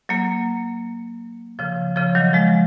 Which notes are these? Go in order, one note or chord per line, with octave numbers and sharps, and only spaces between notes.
F#3 A#3
C#3 F3
C#3 F3
D#3 F#3
F3 G#3